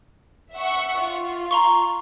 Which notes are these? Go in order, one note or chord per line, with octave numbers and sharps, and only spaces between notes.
E5 F#5 C#6
F4
A#5 C6 C#6